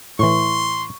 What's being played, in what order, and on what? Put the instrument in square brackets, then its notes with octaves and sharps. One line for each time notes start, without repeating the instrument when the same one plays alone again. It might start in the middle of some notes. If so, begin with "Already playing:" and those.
[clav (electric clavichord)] A2 E3 [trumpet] C6 [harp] C#6